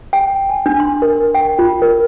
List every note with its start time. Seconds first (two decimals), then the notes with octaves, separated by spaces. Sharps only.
0.13 G5
0.50 G#5
0.66 D4
0.80 C6
1.02 A#4
1.35 G5
1.59 F4
1.82 A#4